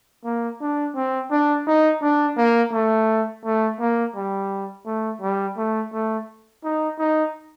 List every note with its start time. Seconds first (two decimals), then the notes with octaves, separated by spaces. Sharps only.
0.24 A#3
0.61 D4
0.96 C4
1.31 D4
1.67 D#4
2.02 D4
2.38 A#3
2.73 A3
3.45 A3
3.80 A#3
4.16 G3
4.86 A3
5.22 G3
5.57 A3
5.93 A3
6.64 D#4
6.99 D#4